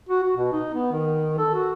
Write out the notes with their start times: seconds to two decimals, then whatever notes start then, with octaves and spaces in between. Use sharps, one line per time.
0.09 F#4
0.23 F#4
0.36 B2
0.52 D#4
0.73 B3
0.91 D#3
1.38 A4
1.54 F#4